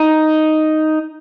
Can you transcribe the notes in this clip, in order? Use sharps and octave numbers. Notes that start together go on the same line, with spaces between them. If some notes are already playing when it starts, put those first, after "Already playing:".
Already playing: D#4